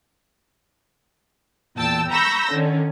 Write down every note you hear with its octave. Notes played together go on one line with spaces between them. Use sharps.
E2 A#2 G5 A5 E6
A#5 B5 C#6 E6 G6 A#6
D3 D#3 C#4